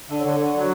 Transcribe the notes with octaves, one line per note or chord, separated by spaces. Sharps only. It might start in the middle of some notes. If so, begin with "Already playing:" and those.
D3 E5
C#5
D3 D4
D3 D4
F#3